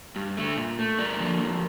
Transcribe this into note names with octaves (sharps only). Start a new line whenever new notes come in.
G2
D3 A3
A#2
A3
G2 A#4 D5
D3 F3 A#3
F2